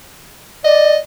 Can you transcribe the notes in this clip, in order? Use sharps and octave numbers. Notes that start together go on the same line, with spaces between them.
D5 D#5